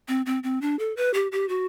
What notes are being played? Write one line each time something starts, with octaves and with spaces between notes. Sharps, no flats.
C4
C4
C4
D4
A4
B4
G4
G4
F#4